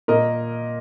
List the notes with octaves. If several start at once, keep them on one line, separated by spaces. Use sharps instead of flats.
A#2 A#4 D#5